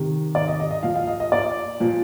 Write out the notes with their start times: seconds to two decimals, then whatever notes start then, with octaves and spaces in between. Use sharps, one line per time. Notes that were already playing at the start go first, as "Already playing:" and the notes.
Already playing: C3 D#3
0.35 D5
0.48 D#5
0.60 D#5
0.71 D#5
0.83 A#2 F3 F5
0.96 F5
1.07 D#5
1.20 D#5
1.32 D5
1.80 A#2 F3